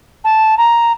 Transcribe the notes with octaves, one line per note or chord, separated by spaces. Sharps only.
A5
A#5